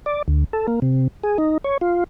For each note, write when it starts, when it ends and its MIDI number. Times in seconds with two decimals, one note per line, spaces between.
0.06 0.22 74
0.28 0.44 38
0.53 0.67 69
0.68 0.80 58
0.82 1.08 48
1.24 1.38 68
1.38 1.58 63
1.64 1.78 73
1.81 2.04 65